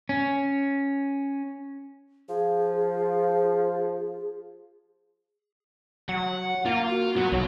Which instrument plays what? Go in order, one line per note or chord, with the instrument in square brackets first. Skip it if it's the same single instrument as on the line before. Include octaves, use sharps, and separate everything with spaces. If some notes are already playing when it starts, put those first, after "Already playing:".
[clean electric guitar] C#4
[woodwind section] F3 [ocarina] G#4
[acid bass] F#3 [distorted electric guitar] F#5
[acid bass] A#3 [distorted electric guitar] F4
[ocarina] F#4
[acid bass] F#3 [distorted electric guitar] B3
[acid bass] B1 [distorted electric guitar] F#3 C#5